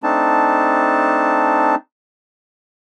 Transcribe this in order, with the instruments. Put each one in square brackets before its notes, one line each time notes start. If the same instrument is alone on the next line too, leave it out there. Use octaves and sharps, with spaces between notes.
[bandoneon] A3 C4 D4 D#4 A5